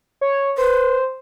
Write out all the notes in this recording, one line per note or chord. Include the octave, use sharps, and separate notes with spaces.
C#5
B4 C5